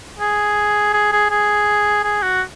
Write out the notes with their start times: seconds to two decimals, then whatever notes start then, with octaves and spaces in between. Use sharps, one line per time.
0.20 G#4
0.94 G#4
1.12 G#4
1.31 G#4
2.04 G#4
2.22 F#4